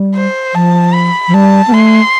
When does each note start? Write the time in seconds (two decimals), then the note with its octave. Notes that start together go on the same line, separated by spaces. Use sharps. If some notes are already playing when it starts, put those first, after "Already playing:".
Already playing: G3
0.15 C5
0.54 F3 A5
0.93 B5
1.28 F3
1.34 G3 A5
1.68 B3
1.72 A3 C6